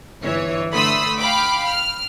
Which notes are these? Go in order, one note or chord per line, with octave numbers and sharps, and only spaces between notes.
G1 E3 C#5
D3 A3 B5 C6 D#6 E6
F5 G5 B5 D6
F6